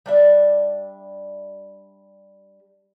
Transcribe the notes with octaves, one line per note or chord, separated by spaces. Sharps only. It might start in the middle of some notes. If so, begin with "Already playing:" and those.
G3 D4 E5